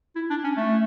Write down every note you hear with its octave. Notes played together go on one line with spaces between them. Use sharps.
E4
D4
C#4
A3